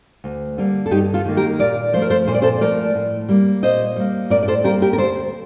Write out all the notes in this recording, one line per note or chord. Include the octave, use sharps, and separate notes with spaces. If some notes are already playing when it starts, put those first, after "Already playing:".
D2
D3 G3 A#3
A4
G2 D#4 G4
F4 A4
D#3 A#3
G4 A#4
A#2 A#4 D5
F3 A3 C5
A#4
A4 C5
A#2 C5
D5
A4 C5
F3 A3 A#4 D5
A2
G3 A#3
A#2 C5 D#5
G3 A#3
A2 A#4 D5
D5
A4 C5
G3 A#3 G4 A#4
G4 A#4
A#4
D2 A4 C5